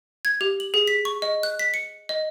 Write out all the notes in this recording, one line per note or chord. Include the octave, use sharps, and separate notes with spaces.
G#6
G4
F#7
G#4
B6
C#6
D#5
F#6
B6
C#7
D#5